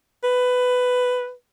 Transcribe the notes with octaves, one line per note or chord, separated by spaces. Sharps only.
B4